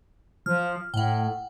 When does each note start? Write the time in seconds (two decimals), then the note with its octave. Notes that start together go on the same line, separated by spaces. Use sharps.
0.46 F3 F6
0.94 A2 F#5 G5